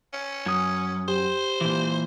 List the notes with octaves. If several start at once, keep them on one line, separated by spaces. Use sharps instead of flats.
C#4
F#2 D#6 G#6
G4 C5
A#2 E3